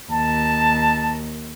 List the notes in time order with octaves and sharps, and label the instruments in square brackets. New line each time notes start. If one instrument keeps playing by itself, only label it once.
[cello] D#2 [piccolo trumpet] A5